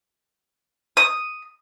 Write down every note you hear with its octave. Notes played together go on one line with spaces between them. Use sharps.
D#6